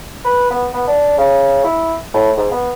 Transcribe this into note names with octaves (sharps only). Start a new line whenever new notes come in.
B4
B3
B3
D4
C#3
E4
A2
G#2
B3